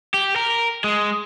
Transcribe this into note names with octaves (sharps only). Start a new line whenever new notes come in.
G4
A#4
G#3